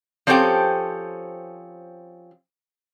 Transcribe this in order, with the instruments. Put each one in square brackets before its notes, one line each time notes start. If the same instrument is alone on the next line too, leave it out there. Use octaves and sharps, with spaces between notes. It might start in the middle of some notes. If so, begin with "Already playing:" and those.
[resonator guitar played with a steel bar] F3 C4 C#4 G4 A4 G5